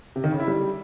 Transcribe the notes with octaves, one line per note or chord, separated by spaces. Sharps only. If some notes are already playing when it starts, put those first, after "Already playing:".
C3
D#3
C#3
E4
G3